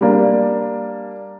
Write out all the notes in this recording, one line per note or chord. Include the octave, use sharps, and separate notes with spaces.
G3 A#3 D4